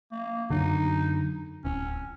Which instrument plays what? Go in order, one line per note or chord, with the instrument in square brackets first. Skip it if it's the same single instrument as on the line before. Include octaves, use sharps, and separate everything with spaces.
[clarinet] A#3
[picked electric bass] F#2 D3 [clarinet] D#4
[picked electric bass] D1 [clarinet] C#4